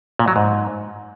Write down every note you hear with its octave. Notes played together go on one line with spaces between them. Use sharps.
A#2
F#3
G#2